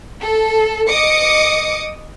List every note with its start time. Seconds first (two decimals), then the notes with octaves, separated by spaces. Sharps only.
0.21 A4
0.87 D#5 D6 D#6 C#7